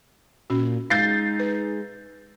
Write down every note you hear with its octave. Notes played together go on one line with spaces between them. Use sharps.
A#2 C#4 F#4
G#3 D#4 F5 G6 A6 C7
B4